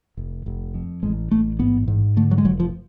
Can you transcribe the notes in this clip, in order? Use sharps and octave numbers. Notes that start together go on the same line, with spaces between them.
F1
F1
F2
A1 G#3
A1 A3
G#2 B3
G#2
D3 A3
F#3
G#3
F1 F#3
F3